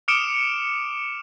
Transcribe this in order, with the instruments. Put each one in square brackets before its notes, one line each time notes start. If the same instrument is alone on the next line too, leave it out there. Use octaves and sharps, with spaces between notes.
[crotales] D6 D#6 F6 C#7 D7 E7